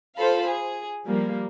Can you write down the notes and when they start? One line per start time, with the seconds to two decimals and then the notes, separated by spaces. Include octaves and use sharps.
0.16 F4 A4 C5 F5 B5
0.47 G#4
1.06 F3 G3 A#3